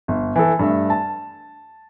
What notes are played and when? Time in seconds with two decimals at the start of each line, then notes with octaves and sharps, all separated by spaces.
0.08 G1
0.36 E3 A4
0.59 G2 A3 E5
0.90 A5